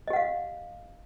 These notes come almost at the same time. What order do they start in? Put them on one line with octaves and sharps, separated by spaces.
D#5 G4 F#5 F5